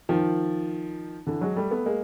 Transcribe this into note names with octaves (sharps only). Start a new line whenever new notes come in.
D#3 F3
D3 E3
F#3 G#3
G3 A3
A3 B3
G#3 A#3